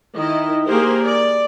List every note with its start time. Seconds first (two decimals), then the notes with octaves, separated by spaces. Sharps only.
0.16 D#3 E4 D#5
0.66 A#3 G4 G#4 A#4 C5
1.04 D5